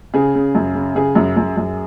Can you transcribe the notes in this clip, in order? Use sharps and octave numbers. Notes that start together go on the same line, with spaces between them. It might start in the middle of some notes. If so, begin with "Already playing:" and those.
C#3 G#4
C#3
F#2
C#3
C#3 G#4
F#2
F#2
F#2